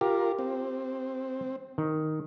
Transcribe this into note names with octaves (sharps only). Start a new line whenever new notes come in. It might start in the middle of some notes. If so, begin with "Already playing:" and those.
F4 G4 A#4
C4
D#3